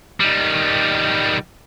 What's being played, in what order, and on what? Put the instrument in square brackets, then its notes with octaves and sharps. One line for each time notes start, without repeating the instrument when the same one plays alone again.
[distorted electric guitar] D#3 G3